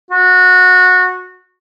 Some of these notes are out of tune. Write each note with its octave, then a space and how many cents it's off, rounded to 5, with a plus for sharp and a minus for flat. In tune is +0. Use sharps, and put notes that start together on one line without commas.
F#4 -20